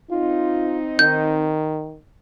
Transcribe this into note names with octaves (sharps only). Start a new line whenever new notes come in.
C4 D#4 F4
D#3 G6